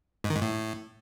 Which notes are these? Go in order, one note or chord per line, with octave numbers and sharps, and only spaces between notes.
G#2
D#3
G#2
A2